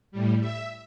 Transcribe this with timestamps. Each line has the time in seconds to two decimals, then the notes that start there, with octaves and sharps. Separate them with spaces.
0.12 A2 G3
0.40 E5